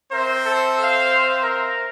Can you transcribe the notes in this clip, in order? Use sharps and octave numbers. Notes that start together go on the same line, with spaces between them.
C4 A#4 C5 E5
A4
F5
A#4